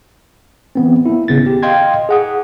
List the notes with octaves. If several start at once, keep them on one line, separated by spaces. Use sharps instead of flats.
E3 B3 C4
A#3 E4
G#1 C#3 B3 A6
G4
D#5 F5 G5 C6 G#6
G#4 F#5 D#6